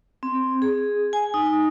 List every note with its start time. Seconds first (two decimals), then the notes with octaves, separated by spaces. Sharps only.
0.23 C4
0.62 G#4
1.13 G#5
1.34 D#4